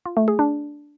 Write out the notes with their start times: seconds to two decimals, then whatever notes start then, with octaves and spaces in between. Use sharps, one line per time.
0.06 F4
0.17 A3
0.28 G#4
0.39 D4